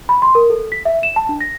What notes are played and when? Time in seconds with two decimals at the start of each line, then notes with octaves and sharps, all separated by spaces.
0.09 B5
0.22 C6
0.35 A#4
0.50 A4
0.72 B6
0.85 E5
1.03 E7
1.16 A5
1.29 D4
1.41 A#6